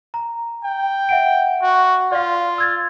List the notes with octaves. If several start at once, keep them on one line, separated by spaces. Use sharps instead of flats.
A#5
G5
E5 F#5 D7
F#4
F4 D5 F5
E6 G#6 A6